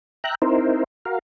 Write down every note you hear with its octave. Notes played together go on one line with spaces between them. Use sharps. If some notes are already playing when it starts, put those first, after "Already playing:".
E5 G5 A#5 F#6
C4 D#4 E4 A#4 C5
F#4 A#4 F5